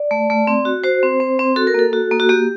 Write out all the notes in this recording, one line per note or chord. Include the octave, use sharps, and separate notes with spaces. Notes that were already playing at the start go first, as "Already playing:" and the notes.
Already playing: D5
A3
A3
C4
F#4
F#4 C5
C4
C4
C4
F#4 A4
A#4
A#3 A4
F#4
A#3
F#4
A#3 G4